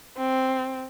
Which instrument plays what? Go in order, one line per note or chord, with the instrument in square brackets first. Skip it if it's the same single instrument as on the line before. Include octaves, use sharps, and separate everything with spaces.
[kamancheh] C4